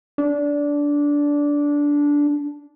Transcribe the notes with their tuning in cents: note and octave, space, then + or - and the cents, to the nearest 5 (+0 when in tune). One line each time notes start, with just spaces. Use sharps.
D4 -15